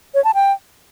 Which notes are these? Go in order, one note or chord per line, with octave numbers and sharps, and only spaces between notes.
C#5
A5
G5